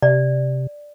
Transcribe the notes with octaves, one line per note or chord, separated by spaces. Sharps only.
C3 D5